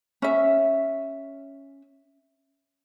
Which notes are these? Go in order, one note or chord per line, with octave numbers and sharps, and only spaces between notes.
C#4 E5